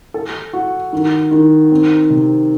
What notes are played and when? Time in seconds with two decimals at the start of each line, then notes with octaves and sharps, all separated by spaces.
0.14 A4
0.53 F#4
0.93 D#3
1.31 D#3
1.72 C4
2.10 C3